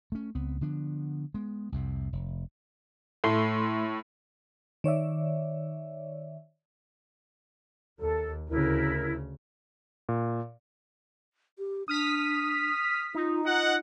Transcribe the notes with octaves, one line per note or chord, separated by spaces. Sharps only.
A3 C#4
C#2 B3 C4
D3 F3 B3 D4
G#3 B3
C2 F2 C3
F1
A2 A3 C6
D#3 C#5 D5 E5
D#2 A4
D2 C#3 E4 A#4
A#2
G4
D4 D#6 F6 B6
D#4 F4
F4 D#5 F#5